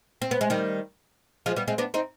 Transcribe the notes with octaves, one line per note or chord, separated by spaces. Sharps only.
C4
B3
G#3
D#3 G3
F3 G#3
G3 B3
G#3 C4
B3 D4
C4 D#4